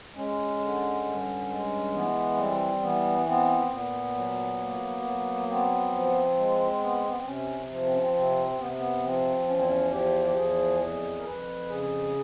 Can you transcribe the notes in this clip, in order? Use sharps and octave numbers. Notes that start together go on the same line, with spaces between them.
G#3 C#4
D3
G2
G#3
E3 B3
G3 C4
E3 B3
B3 C4
A#2 B3
F#3
A#3
F#3
B3 C4
F3
G#3
B3
B3
C4
C3 C#4
F3
C4
C#4
C4
C3 C4
C3 B3
B3
F3 C4
E2 C#4
C4
C#4
F3 G4
G4
E2 G#4
F2 G#4
A#4
F2 B4
C#3 G#4